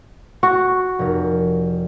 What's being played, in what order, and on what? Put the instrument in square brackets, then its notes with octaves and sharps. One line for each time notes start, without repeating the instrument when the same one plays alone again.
[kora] F#4
[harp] F1 A#4